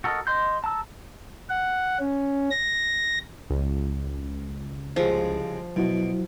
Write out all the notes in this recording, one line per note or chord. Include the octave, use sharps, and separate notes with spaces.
F#4 A4 A#4 D#5
D#5 C6 G6
A5 A#5 E6
F#5
C#4
A#6
C#2
C2 C#3 F3 G#3
B2 F#3 E4 F#4